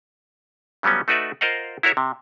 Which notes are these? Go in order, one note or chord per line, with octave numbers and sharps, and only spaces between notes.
C#3 F#3 G3 B3 C#4
A3 D#4 F#4 B4 D5 E5
F4 A#4 C5 D#5 F5 F#5
E4 F#4 A#4 C#5 E5
C3